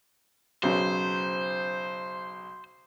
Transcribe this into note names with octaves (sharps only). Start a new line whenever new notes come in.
B1 C#3 F#3 C5